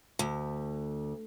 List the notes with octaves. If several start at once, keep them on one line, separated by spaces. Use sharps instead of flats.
D2